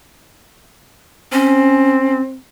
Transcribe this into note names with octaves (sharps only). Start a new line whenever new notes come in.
C4 C#4